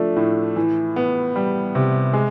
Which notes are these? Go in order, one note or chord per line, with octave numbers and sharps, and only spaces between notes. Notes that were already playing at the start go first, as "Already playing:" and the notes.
Already playing: F3 A3 D4
A2
E3
B3
G3
C3
G#3